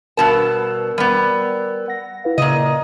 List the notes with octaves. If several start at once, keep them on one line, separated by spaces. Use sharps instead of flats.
G2 B2 A#4 A5 E6
G3 B3
F#5 A#6
E4 B4 F5
A#2 C#3 D#5